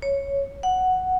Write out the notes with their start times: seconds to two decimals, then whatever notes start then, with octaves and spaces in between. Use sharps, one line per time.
0.02 C#5
0.63 F#5